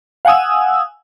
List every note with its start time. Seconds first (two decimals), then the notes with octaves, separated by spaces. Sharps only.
0.25 F5 F#5 G#5 D#6 E6